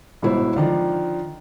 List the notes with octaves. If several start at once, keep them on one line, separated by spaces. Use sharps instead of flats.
G1 G#2 B2 E4 C5
D3 D#3 F3